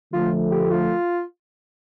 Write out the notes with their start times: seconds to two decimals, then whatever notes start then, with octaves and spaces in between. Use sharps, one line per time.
0.13 D3 F3 A3 F4
0.51 G4
0.70 F4